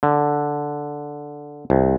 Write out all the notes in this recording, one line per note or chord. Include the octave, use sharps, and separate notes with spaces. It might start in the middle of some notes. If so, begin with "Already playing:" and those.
D3
C2